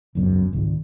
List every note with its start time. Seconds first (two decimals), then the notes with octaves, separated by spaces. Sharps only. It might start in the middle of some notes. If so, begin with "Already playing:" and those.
0.15 E1 C#2 F#2 B2
0.53 G#1 C#2